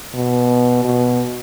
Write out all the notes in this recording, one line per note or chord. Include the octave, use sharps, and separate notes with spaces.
B2
B2